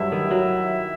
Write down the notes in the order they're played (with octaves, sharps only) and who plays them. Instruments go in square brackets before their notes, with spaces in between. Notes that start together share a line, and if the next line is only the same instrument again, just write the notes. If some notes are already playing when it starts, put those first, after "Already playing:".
Already playing: [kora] G2 F#3 [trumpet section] E4 E5
[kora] D#3
F#3